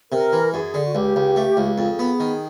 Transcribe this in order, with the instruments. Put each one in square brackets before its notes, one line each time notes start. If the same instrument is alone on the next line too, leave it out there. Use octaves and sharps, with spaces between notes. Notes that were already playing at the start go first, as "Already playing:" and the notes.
[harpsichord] C3 [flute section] A#4
[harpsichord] E3
[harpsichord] F#2 [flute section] G#4
[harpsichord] D3
[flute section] F#4
[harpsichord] C#2 [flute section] G4
[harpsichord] C#2
A3
C#2
[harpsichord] F2 [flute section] G#4
[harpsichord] B3
D#3